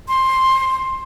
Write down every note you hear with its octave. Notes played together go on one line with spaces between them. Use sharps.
C6